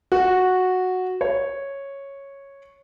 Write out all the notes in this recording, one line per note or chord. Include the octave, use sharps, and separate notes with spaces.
F#4
C#5